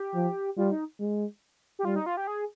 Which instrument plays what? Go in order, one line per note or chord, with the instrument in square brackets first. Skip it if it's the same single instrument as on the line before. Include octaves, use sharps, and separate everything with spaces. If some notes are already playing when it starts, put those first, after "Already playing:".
Already playing: [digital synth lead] G4
[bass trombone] F3
[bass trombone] G3 [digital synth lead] F4
[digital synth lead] D#4
[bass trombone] G#3
[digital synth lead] G4
[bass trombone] G3 [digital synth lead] F4
[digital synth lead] D#4
F4
G4
G#4